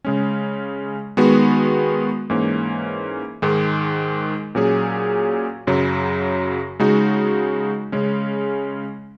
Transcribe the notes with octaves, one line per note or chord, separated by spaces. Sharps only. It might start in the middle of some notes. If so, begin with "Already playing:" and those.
C#3 G#3 C#4
D#3 G#3 B3 F#4
G#2 E3 A#3 C#4
G#2 D#3 G#3
A#2 F#3 C#4 G#4
F#2 C#3 F#3
C#3 G#3 D#4 F#4
C#3 G#3 C#4